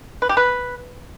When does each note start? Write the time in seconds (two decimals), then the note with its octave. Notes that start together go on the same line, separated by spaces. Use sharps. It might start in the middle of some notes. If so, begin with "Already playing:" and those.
0.22 B4
0.29 G4
0.37 B4